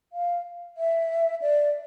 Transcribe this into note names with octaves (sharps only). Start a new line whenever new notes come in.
F5
E5
D5